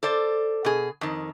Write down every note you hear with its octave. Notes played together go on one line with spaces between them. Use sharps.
A4 C5 D5
B2 G#4
F2 D#3